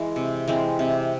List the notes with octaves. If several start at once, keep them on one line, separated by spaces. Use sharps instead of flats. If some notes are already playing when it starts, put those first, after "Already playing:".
Already playing: E3 G#3
C3
E3 G#3 C4
C3